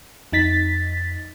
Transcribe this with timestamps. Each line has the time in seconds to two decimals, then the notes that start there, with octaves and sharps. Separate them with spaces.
0.32 F2 D#4 A6 B6